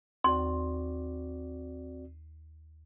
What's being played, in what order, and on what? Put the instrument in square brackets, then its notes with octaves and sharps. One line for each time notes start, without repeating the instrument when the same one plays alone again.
[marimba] D#2 [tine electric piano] C4 F#4 D5 [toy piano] C6